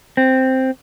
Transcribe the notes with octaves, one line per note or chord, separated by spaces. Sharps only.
C4